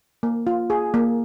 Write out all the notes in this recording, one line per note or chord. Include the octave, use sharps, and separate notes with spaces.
A#3
F4
G#4
A#3